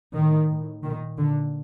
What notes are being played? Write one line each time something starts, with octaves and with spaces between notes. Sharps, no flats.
A2 D#3
A2
A#2 D#3
A#2 D3